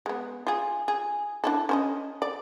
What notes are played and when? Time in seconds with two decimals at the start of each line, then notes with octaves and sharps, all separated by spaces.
0.06 G#3 B3
0.47 F4 G#4
0.88 G#4
1.44 D4 E4 A4
1.69 C#4 C5 D#5
2.22 D5